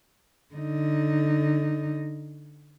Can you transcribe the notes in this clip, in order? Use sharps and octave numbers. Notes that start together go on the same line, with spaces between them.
D3 D#4